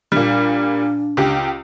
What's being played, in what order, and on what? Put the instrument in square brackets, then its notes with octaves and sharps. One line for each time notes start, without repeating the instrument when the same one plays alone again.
[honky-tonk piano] A#2 G3 [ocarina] D4
[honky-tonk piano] C#2 G4